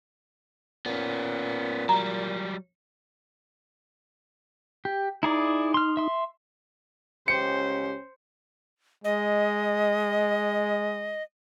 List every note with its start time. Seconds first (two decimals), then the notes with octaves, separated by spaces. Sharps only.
0.86 A#2 B3 C#4
1.89 F#3 G3 A#5
4.85 G4
5.23 D#4 E4 G#4 D5
5.74 C6 F6
5.97 E5 C6
7.28 C#2 C#4 G4 C5 C#7
9.04 G#3 D#5